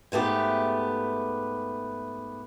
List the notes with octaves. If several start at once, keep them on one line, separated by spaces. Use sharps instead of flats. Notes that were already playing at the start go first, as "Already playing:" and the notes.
G#2 A3 B3 G4